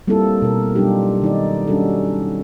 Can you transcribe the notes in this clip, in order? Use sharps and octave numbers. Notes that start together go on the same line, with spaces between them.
G3 A#3 C4 E4 F4 A4
B2 A#4
F#3 G3 D4 D#4 F4 G4
D#3 D#4 D5
G3 C#4 D4 F#4 A4